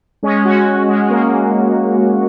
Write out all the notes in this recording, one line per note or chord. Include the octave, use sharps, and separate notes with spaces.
G#3 C#4
C#4 F#4
G#3 C#4
G#3
A#3